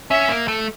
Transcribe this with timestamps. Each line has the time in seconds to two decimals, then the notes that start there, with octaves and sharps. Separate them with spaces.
0.11 C#4 E5
0.29 A#3
0.48 A3